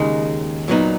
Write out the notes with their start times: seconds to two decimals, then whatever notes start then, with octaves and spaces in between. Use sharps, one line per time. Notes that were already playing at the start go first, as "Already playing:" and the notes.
Already playing: D#2 C#3 G#3 D#4
0.68 A#2 F#3 B3 D#4